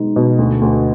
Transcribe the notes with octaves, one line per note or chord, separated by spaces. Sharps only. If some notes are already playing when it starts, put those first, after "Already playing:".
Already playing: B2 G#3 B3 D#4
B2
D2
D2